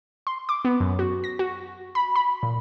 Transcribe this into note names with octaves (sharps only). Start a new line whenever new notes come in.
C6
D6
B3
F#2
F#4
A#6
F#4
B5
B5
A#2